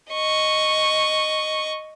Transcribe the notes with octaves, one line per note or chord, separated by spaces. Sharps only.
D#5 C#6